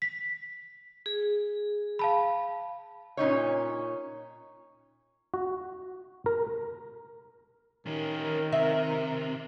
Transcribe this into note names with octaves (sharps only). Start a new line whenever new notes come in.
B6
G#4
F5 A5 B5
A#2 C#4 D#4 C#5
F#4
A#4
D#3 C#4 G4 A#4
C3 E5